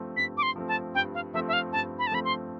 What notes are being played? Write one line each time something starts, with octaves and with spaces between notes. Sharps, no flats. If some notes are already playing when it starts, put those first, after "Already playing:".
Already playing: G2 F3 A3 C4
G2 B6
D6
C6
F3 A3 C4
A5
G2 G5
F5
F3 A3 C4 E5
E5
F5
G2 A5
B5
A5
F3 A3 C4 B5
C6